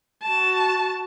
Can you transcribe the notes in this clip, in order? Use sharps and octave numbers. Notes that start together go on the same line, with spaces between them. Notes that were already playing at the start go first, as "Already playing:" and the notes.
F#4 A5